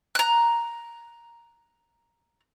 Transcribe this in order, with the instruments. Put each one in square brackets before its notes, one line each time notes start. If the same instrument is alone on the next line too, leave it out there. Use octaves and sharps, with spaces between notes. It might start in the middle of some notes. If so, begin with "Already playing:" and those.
[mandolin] A#5 F#6